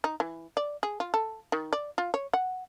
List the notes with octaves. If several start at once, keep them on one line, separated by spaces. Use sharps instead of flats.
D#4
E3
D5
G#4
F4
A4
D#3
D5
F4
C#5
F#5